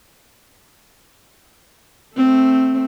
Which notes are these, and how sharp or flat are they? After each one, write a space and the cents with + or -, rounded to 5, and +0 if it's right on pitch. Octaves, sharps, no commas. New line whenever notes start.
A3 +0 C4 +0